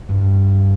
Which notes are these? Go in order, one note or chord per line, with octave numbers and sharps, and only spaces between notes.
G2